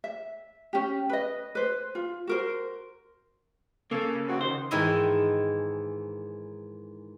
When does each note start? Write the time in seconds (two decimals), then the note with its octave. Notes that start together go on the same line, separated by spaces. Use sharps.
0.04 E5
0.73 C#4 G4
1.10 B4 D#5
1.55 B4 C5
1.95 F4
2.27 F#4 A#4 C5
3.91 C#3 A#3 A4
4.28 C4 D4 F#4
4.41 D#3 C5
4.71 G#2 D#3 E3 E4 D#5